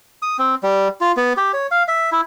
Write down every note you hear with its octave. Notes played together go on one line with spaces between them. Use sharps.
D#6
C4
G3
F4
B3
G4
C#5
F5
E5
E4